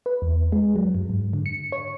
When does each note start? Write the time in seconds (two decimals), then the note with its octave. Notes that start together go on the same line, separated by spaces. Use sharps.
0.06 B4
0.22 E2
0.52 G#3
0.76 F#3
0.95 F#2
1.09 G#2
1.33 D3
1.46 C#7
1.72 C#5